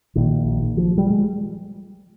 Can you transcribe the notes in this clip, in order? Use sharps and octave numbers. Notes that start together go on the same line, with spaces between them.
A#1 A#2 D#3
F3
G3
G#3